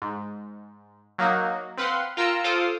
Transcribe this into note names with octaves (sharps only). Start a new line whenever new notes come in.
G#2
F#3 A#3 D#4 F#4
C4 B4 F5 F#5 C6
F4 A#4 G5 A#5 E6 C#7
F4 A4 C5 D6 D#6 F6